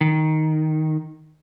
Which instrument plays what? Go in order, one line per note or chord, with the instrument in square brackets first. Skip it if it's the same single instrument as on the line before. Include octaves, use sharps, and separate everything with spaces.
[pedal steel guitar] D#3